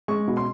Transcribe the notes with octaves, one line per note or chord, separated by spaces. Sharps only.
G#3 C#6
B2
C6